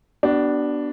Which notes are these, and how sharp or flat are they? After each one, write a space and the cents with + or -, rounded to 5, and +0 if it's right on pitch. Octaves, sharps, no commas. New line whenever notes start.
B3 -5 D4 +0 F#4 +45